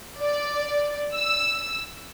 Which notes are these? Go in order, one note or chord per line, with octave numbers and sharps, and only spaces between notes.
D5
E6